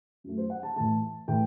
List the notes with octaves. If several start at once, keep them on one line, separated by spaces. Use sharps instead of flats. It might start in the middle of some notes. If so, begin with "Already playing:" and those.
F#2 F#3 A3
C5
F#5
A5
A2 E3 A3 A5
A2 E3 A3 G5